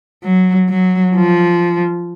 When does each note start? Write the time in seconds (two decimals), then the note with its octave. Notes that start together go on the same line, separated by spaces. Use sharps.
0.23 F#3
0.69 F#3
1.15 F3